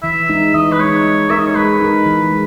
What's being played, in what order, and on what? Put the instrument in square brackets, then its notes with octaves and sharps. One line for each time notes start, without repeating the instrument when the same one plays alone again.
[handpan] E3 [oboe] E5
[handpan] G#3 D#4
[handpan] E3 [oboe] D#5
[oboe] B4
[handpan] G#3 D#4 [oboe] C#5
[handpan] G#3
[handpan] D#4 A#4 [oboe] E5
[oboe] D#5
C#5
[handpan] G#3 [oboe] B4
[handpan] D#4 A#4
E3
G#3